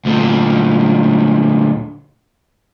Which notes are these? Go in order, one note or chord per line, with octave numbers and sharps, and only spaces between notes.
D2 A#2